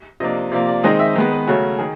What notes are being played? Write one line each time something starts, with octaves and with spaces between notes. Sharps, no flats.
C3 F3 A#3 D4 D#5
C3 F3 A#3 D5
D5
D#3 G#3 C4 D#4 D#5
E5
D#3 G#3 B3
B4
C#3 F#3 A3 C#4 F#4
D#3 G#4